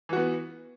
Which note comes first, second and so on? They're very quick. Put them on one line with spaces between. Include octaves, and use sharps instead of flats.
E3 F#4 B3